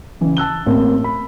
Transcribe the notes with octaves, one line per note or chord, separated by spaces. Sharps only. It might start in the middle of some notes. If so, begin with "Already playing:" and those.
C#3 E3
A5 E6 F#6 G7
A1 A#3 C4
B5